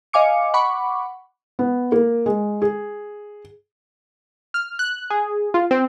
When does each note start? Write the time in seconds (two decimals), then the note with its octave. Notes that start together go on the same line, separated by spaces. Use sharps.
0.13 D#5 F5 G#5 D6 C#7
0.54 F#5 B5 C#6 D6
1.59 B3
1.92 A#3
2.26 G#3
2.62 G#4
4.54 F6
4.79 F#6
5.10 G#4
5.54 F4
5.71 C4